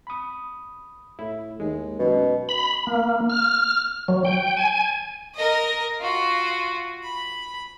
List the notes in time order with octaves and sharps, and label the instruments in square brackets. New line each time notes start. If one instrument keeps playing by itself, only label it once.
[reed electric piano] B5 D#6
[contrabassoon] A2 [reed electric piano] E4
[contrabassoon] D#2 [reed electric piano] G#3
[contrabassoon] F#2 [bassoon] B2
[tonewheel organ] B5
A#3
F6
F#3
G5
G#5
[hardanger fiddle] A#4 D#5
F4 F#4
B5